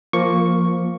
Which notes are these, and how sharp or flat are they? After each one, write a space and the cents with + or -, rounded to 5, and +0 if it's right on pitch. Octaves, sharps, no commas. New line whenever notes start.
F3 +0 A#3 +0 C#6 +0